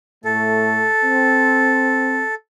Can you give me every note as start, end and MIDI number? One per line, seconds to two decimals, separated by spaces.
0.25 0.87 45
0.25 0.87 57
0.25 2.34 69
1.03 2.22 60